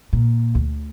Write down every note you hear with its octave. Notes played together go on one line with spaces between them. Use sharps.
A#2
D2